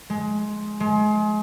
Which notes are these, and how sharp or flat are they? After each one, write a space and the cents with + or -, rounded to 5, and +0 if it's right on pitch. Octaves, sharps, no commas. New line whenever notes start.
G#3 +15
G#3 +30